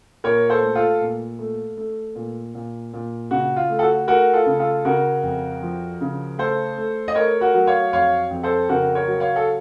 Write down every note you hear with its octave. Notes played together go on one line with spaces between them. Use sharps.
A#2 A#4 C#5
A4 C5
A3
F4 A4
A#2
A3
A3
A#2
A#2
A#2
C#3 F#4
F4
A3
A4
F#4
A3 F#4 A#4
F4 A4
C#3
F4 A4
C#3 F#4 A#4
F2
F3
C#3
A3 A4 C5
A3
D#5
A3 A#4 C#5
F#4 A#4
F#3
C#5 F5
F2 C#5 F5
F2
A4 C5
C#3 F#4 A#4
A#4 C#5
F#3
C#5 F5
A4